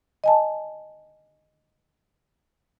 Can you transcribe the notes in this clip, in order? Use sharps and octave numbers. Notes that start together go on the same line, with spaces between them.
D#5 G#5 A5